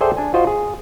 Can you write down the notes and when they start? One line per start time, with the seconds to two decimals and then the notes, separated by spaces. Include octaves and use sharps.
0.01 G#4 A4 C5 D5 E5 G5
0.17 D4 G#5
0.34 F4 F#4 C5 D#5
0.47 G#4